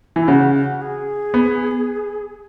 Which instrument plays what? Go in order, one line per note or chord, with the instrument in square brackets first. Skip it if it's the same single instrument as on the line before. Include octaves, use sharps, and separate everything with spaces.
[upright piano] E3 [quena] E4
[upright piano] C#3 [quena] F#4
[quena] F#4
G#4
[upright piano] B3